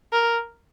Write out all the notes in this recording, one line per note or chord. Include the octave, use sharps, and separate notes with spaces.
A#4